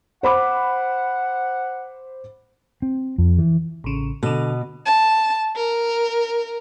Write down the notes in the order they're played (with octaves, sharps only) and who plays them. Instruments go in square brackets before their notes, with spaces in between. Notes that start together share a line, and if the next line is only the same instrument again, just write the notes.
[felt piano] C5 B5 D6 [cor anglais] F#5
[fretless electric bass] C4
F2
E3
[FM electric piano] A1 C#3
[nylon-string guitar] B2 [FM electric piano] D3 A4
[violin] A5
A#4